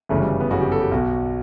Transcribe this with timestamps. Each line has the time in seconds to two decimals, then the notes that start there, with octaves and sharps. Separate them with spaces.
0.09 G1 F#2 C#3 E3 A3
0.20 G3
0.40 B3
0.50 G1 F#2 C#3 E3 F#4
0.61 G4
0.72 A4
0.81 G4
0.91 B1 B2 F#4